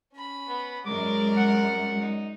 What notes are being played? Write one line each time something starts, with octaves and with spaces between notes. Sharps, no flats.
C#4 B5
B3
F#2 F#3 G#3 A#4 D5 D6
F#5
D#4